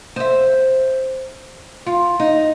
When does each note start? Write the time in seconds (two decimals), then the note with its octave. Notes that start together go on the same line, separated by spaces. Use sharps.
0.16 C5 E5
1.86 F4
2.20 D#4